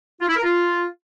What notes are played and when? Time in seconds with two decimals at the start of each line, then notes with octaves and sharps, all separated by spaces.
0.21 F4
0.29 E4
0.36 A#4
0.44 F4